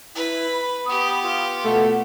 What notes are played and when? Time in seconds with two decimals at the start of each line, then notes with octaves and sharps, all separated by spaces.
0.15 E4 B4
0.53 B5
0.86 B3 G4 D#6
1.22 F4 B4
1.65 B2 A3 F#5